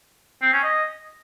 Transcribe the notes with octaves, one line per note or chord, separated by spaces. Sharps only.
C4
C#4
D#5